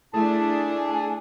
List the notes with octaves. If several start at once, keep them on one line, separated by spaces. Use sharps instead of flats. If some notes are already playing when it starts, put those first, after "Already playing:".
A3 D4 E4 G#4 A5